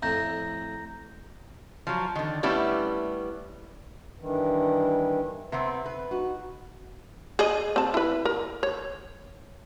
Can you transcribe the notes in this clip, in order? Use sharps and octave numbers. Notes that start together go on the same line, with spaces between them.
F2 A2 A3 A#5 G6 A#6
F3 F#3
D3 D#3
G3 A3 B3 C#4 E4 G4
G2 D#3 E3
C3 B3 C4
B4
D#4 F#4
G#4 D#5
C4 A5
E4 B4
A#4
C#5